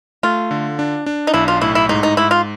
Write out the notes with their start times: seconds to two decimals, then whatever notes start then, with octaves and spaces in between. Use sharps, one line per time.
0.23 A3 F4
0.51 D3
0.79 D4
1.06 D4
1.27 D#4
1.34 B1 E4
1.48 F4
1.61 A2 E4
1.75 E4
1.89 G#2 D#4
2.03 D#4
2.17 G#2 E4
2.31 F4